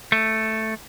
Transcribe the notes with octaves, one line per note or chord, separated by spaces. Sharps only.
A3